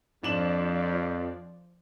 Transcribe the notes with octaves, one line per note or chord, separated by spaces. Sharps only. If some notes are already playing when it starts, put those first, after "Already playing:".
F2 F3 D4 D5 E7 F#7